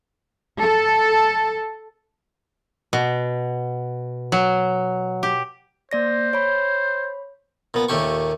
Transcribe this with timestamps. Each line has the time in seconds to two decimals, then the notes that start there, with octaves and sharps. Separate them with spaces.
0.60 A4
2.93 B2
4.32 F#3
5.23 G4
5.91 A#3 C5 D5 A#6
6.33 C#5 B5
7.74 A#2 B3
7.89 D#2 A#2 A3 G4 C#6